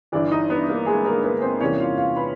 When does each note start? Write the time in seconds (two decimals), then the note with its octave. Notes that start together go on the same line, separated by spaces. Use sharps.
0.12 G1 G2 E3 D4 D5
0.32 D#4 D#5
0.50 B3 B4
0.68 A#3 A#4
0.86 G#3 G#4
1.05 A#3 A#4
1.24 B3 B4
1.42 C4 C5
1.60 E2 C3 E3 G3 A#3 C#4 C#5
1.80 F4 F5
1.97 F4 F5
2.16 B4 B5